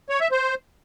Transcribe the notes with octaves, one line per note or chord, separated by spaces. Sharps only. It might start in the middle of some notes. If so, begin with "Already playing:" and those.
C#5
E5
C5